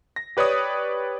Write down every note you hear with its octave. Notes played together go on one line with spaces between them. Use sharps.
A#6
G4 B4 C#5 D5 D#6